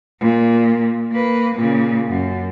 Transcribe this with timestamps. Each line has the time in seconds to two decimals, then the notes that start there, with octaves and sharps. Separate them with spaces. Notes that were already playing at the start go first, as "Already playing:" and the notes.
0.20 A#2
1.12 A#3 B4
1.56 A#2 C#3
2.08 F#2